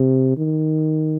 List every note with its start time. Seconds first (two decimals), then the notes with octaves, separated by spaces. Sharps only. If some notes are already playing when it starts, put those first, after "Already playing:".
Already playing: C3
0.38 D#3